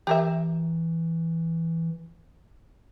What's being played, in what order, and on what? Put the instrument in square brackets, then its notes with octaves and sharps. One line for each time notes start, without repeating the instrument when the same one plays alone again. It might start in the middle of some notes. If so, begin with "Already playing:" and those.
[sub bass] E3 [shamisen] G4 A#4 E5